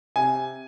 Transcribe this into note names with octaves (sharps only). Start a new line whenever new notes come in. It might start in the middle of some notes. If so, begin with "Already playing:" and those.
C3 G#5